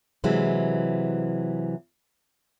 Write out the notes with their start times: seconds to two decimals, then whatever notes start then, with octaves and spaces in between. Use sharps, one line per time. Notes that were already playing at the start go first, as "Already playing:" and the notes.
0.24 C3 E3 F#3 G#3